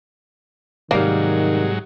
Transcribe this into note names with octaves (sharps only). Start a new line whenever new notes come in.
G#2 C3 D#3 F#3 G3 A#3